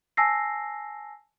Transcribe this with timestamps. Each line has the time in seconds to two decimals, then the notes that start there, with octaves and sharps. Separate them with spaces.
0.17 G#5 A5 E6 A#6 C7